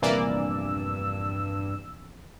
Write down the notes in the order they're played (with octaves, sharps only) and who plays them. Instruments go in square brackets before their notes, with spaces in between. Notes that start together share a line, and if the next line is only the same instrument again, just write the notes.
[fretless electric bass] A#1 E2 C3 [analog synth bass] G2 [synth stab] E3 A#3 D5 [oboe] E6